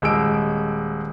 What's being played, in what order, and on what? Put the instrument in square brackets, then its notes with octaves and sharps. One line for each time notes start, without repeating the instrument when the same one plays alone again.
[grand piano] D#1 G#3 E6 D7